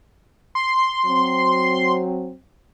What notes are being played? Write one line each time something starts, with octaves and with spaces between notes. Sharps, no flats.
C6
F#3 C4